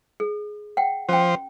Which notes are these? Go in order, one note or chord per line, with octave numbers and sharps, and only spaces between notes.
G#4
F#5 G5
F3 C#4 C5 G5